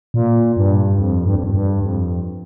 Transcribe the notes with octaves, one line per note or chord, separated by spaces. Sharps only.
A#2
G2
F2
G2
F2
G2
G2
F2